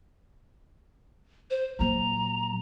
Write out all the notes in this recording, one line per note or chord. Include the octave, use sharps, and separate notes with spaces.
C5
A#2 F#3 A#5